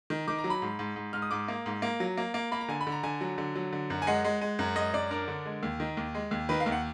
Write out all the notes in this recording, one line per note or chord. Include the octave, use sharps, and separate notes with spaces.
D#3
D#3 D6
A#5
F#3
B5
G#2
G#2
G#2
G#2 F6
D#6
G#2 D6
A#3
G#2
A#3
F#3
A#3
A#3
A#3 B5
A#5
D3 G#5
B5
D3
A#5
D3 G#5
F#3
D3
F#3
D3
F#2
G#5
G#3 F#5
G#3
G#3
F#2
G#3 D#5
F#2 D5
D4 A#4
D3
G#3
D#2
D#3
D#2
G#3
D#2
D#3 B4
F5
D#2
F#5